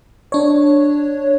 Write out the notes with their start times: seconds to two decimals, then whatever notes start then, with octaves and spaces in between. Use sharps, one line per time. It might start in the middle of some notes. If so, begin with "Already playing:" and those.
0.32 D4 C#5